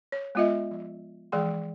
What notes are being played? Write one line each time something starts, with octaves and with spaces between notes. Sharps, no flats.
C#5
G#3 B3 F4 D#5 E5
F3
E3 F3 G#3 G#4 G5 C6